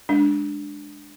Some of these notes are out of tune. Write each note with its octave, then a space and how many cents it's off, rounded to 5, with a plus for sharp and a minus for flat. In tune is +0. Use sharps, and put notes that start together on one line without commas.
G#3 -5 D4 +0